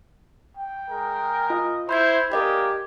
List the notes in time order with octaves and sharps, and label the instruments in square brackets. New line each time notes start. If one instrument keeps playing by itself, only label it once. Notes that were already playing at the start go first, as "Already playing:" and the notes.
[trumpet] G5
[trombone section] G#3 A#4
[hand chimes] F4 [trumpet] D#5
[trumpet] E4 [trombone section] C5 [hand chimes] B5 G6 G#6
[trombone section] G#3 A#3 D4 [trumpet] G4 [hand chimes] A#4 D#5 G#6